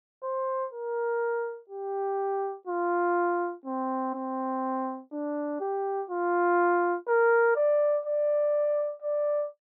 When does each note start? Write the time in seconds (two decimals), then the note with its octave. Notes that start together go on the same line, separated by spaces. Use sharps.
0.23 C5
0.73 A#4
1.69 G4
2.67 F4
3.66 C4
4.15 C4
5.12 D4
5.61 G4
6.10 F4
7.08 A#4
7.56 D5
8.05 D5
9.02 D5